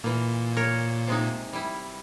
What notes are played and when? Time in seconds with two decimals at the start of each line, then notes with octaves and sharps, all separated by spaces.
0.04 A#2 E3 A#3
0.57 A#4 C#5
1.08 C3 G#3 D#4
1.53 G3 E4